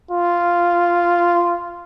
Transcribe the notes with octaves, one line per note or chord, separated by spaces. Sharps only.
F4